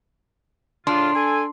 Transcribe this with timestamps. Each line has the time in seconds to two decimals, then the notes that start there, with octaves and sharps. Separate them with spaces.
0.87 A2 C#3 D4 F4 C6
1.15 A4 G#5